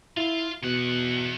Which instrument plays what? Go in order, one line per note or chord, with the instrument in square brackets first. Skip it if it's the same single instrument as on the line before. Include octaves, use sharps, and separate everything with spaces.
[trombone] E4 [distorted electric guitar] F4 F5
[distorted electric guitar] E2 F#5 [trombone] B2